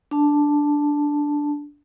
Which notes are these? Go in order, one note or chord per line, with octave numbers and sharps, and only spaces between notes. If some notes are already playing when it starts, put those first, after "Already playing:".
D4 A5